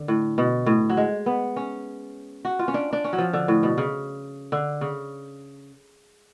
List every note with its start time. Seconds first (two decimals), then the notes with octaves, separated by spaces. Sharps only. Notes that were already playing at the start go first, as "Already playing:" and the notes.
Already playing: D3
0.08 A2
0.38 B2
0.66 A2
0.89 F#3
0.97 G#3
1.26 B3
1.56 C#4
2.45 F#4
2.59 F4
2.68 C#4
2.74 D4
2.93 D4
3.04 C#4
3.13 F#3
3.18 F3
3.33 D3
3.48 A2
3.63 B2
3.78 C#3
4.52 D3
4.81 C#3